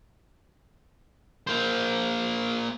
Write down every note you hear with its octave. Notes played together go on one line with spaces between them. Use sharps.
A#3 C5